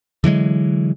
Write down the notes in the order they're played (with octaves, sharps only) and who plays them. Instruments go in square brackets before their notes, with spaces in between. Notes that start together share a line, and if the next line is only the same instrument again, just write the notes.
[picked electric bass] D3 E3 F#3 G#3